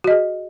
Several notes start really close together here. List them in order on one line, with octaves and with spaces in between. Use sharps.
F#4 D#5 G#4